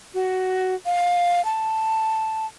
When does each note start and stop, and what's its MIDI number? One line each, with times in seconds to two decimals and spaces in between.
0.14 0.75 66
0.86 1.44 77
1.45 2.46 81